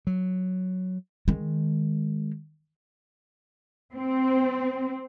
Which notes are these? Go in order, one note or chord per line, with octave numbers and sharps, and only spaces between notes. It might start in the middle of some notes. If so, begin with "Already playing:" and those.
F#3
D#3 G#3
C4